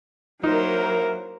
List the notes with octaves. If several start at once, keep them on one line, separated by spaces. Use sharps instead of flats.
F#3 A#3 D#4 E4 A#4 C5